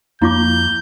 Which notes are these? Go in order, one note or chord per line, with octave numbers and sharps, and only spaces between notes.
F2 A#3 E4 F4 D6 G6